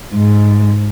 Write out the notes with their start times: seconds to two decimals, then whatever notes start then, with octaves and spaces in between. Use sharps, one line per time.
0.15 G#2